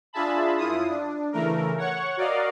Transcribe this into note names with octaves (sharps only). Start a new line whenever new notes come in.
D4 F4 G#4 E5 A5 B5
F#2 E4 F4 D#6
D4
C#3 E3 A3 A#4
C#5 F#5 C#6
F#4 A#4 D5 D#5 F5